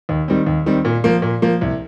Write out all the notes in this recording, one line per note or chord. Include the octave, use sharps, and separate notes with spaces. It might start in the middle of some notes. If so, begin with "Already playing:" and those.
D#2
D#3 G3 C4
D#2
D#3 G3 C4
A#2
F3 A#3
A#2
F3 A#3
C2